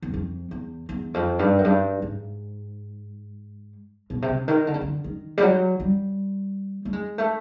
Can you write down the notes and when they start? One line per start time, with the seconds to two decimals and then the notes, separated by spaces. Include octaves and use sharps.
0.02 E2
0.14 F2
0.51 E2
0.89 E2
1.14 F2
1.39 G2
1.59 F#2
1.64 G2
2.02 G#2
4.10 B2
4.22 C3
4.28 C#3
4.48 D#3
4.67 D3
4.74 C#3
4.81 D3
5.04 D#3
5.37 G3
5.42 F#3
5.80 G3
6.85 A3
6.93 G#3
7.18 A3